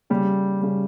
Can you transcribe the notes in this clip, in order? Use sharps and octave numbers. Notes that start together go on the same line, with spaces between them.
C#3 G3
C#3 G3